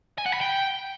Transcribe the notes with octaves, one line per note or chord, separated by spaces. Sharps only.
G#5
F#5
B5
G5